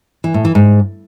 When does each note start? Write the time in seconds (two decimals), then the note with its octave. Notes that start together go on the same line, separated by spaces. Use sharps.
0.24 E3
0.34 A2
0.45 E3
0.55 G#2